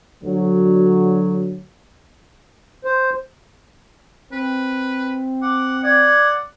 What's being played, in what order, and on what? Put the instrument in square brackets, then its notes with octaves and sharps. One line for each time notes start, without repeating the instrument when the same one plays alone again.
[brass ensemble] D2 F#3
[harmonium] C5
[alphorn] C4 [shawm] B4
[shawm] F#5 [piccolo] D6
[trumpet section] D5 [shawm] F#5 [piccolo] G#6